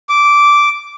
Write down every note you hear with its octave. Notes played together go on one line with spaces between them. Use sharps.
D6